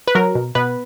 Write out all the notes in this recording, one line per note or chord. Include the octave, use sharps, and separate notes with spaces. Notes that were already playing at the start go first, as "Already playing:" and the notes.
B4
F#3 A#4
B2
B2 B3 B4